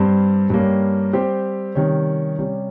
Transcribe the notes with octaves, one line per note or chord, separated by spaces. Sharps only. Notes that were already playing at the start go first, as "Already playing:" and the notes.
Already playing: G2 G3 C4
G2 G3 A#3 C#4
G3 C4 G4 C5
C3 D#3 G3 C#4
C3 G3 C#4